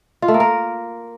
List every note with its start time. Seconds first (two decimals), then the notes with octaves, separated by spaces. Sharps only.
0.22 F4
0.28 A3
0.34 A#3
0.40 A#4